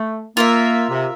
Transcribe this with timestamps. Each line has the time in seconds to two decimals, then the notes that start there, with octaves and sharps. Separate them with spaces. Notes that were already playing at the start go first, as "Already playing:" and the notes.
Already playing: A3
0.37 A#3 F4 A#4 E5
0.90 C3